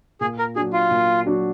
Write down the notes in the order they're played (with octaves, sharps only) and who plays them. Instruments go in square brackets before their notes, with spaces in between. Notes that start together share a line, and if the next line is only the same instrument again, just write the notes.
[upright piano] A#2 [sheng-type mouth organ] G#4
[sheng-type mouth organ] A#4
[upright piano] F#3 D4 F#4 [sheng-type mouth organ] G#4
[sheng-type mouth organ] F4
[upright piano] A#2
F#3 D4 F#4